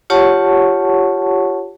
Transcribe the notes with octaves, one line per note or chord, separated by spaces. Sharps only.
F4 G4 C#5 F#5 A5 C#6